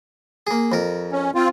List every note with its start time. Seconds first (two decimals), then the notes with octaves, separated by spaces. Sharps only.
0.47 A#3 G#4
0.72 F2 A#4
1.12 C#4
1.35 C4 F4